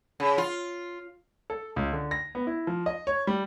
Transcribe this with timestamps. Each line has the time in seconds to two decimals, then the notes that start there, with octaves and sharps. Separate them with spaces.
0.20 C#3
0.38 F4
1.50 A4
1.76 C#2
1.93 D3
2.11 A#6
2.35 B3
2.47 E4
2.67 F3
2.86 D#5
3.07 C#5
3.27 G3